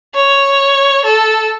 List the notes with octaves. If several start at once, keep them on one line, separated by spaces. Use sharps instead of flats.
C#5
A4